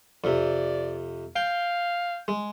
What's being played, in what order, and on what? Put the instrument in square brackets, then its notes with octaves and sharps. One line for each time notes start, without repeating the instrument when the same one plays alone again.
[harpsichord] F2 C3 [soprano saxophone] D5
[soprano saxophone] F5 [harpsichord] G5
[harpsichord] G#3